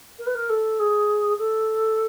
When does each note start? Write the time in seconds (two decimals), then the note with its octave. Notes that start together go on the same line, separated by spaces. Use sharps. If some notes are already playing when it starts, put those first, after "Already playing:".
0.19 A#4
0.26 B4
0.35 A#4
0.49 A4
0.79 G#4
1.38 A4